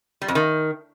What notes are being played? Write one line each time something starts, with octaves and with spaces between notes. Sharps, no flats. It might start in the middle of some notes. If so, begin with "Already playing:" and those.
G3
F2
D#3